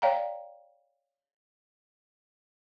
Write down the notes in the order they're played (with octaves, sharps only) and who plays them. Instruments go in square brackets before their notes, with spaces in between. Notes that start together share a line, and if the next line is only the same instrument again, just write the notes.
[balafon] C#5 D5 F5 G5 A#5